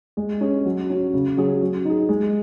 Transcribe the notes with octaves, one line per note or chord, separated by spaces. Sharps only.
G#3
C#4 G#4
F#3
C#4 F#4
C#3
F#3 C#4 G#4
F#3
D#4 G#4
G#3